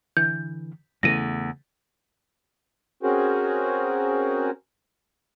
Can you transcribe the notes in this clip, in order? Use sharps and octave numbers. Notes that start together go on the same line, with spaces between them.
D3 E3 G6
E2 C#3 E3 A3 A#6 D#7
C4 C#4 F#4 G#4 A#4 C5